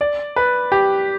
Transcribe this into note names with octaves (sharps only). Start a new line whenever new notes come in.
D5
B4
G4